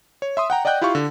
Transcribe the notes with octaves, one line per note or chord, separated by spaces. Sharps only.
C#5
E5 C6 D#6
F#5 G5 A#5
D5 D#5 F#5 G5 F#6 G6
E4 F4 G4 F5 C#6
D3